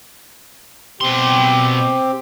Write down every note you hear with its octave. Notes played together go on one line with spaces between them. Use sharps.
B2 C4 G4 C6